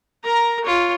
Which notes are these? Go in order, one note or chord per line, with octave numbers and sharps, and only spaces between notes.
A#4 A#5
F4 C#5